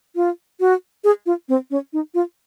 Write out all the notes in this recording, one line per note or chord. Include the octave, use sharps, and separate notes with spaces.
F4
F#4
G#4
F4
C4
C#4
D#4
F4